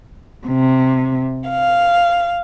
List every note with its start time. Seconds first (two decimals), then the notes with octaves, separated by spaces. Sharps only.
0.46 C3
1.50 F5